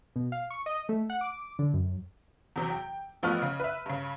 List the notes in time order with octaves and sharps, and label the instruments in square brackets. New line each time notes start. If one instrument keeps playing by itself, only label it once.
[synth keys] B2
F5
C#6
D#5
A3
F#5
D6
D3
F#2
[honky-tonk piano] E2 C3 F#3
G5
A1 F3 A3 B3 F6
C#3
B4 E5
G2 C#3